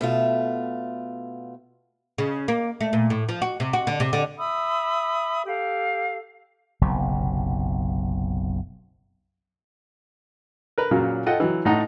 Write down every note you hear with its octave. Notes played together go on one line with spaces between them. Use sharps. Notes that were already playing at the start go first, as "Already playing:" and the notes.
B2 A3 F4
C#3
A#3
A3
A#2
A2
F3
F#4
C3
F#4
D3
C3
D3
E5 B5 D#6 E6
G4 A4 F5
F#1 B1 C3
A#4 B4
A#2 C#3 F#3 A#3
F4 A4 D#5 F#5 G5
E3 F#3
A2 A3 D#4 F#5